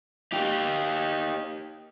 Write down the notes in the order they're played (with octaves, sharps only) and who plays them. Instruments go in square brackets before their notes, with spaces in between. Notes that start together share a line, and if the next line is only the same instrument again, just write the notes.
[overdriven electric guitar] D#4 G4